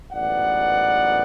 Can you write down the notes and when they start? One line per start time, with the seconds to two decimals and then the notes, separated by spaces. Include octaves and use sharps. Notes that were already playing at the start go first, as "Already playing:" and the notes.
0.12 A1 G#2 F#3 B3 D5 F#5